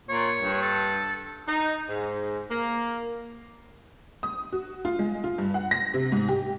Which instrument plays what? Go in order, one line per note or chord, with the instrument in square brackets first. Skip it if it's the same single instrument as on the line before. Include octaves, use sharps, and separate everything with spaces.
[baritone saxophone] A#2 [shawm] C#5
[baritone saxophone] G2
[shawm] A4
[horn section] D#4
G#2
A#3
[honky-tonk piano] D#6
F#4
F4
G#3
F4
G2
F#5
A#6
C3
G#2
G4